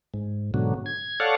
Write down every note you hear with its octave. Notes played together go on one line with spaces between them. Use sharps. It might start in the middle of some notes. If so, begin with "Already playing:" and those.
G#2
G#2 B2 D3 F#3
G#6
A4 C#5 D5 F5 F#5